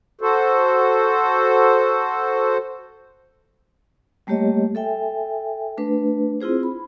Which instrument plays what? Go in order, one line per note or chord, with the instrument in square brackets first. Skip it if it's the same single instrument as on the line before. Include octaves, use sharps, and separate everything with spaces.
[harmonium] F#4 A4 C5
[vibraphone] G3 A3 A#3 G4 C#5 D#5
A4 E5 G5 G#5
A3 D4 B4
C4 E4 F4 G#4 C5
B5